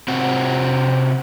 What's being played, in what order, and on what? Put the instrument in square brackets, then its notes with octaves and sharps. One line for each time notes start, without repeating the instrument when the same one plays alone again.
[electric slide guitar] C3 C4 F#4